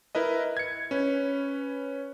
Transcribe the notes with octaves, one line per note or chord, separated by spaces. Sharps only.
E4 A#4 B4 D#5
G#6 C#7
C#4 B4